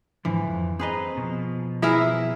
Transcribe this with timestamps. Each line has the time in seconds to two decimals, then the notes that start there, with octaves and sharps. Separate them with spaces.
0.25 G#2 D3 E3 F3
0.47 F2
0.79 C4 G#4 B4 C5 D#5 A#5
1.17 B2 D#3 F3
1.82 B3 E4 G#4 A#4 E5